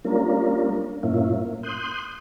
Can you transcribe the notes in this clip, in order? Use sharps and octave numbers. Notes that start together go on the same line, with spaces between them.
G3 A#3 C#4 D4 F4 A#4
G2 A#2 A#3 C#4 E4 F4
A#3
C6 D#6 F#6 G6